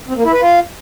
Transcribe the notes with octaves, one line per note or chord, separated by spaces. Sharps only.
C4
A#3
E4
B4
F4